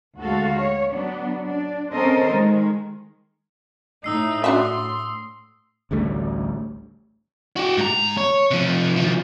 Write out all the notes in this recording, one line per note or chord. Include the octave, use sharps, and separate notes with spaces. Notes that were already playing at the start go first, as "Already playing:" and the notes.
D2 G#3 F#4 A4 F5
C#5
F#3 B3 D4
D4
C4 C#4 A4 A#4 C5 D#5
D#3 G#3
A2 D#4 D#6 E6 C7
D4 F#4 E5 C6
A1 D2 G3 A3
F#4 G4
G#2 A#5
C#5
C3 F3
D#3 F3